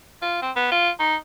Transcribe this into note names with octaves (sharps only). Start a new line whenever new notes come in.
F4
C4
B3
F4
D#4